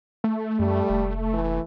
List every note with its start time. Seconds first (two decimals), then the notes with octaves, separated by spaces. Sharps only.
0.24 A3
0.59 F#2 G3
0.90 F1
1.34 E3